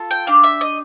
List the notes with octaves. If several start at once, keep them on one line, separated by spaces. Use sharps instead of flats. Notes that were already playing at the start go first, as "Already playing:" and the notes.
Already playing: F4 A4
G5
D4 G4 F5
E5
D#5